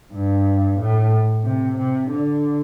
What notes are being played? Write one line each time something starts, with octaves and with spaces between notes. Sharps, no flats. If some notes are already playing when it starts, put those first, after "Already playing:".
G2
A2
C3
C3
D3